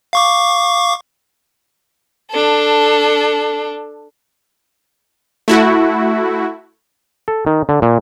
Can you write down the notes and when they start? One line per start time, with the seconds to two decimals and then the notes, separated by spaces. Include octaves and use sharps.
0.13 F5 C#6 D6
2.31 D4 A4
5.48 A3 E4 F#4
7.28 A4
7.47 D#3
7.69 D3
7.82 A#2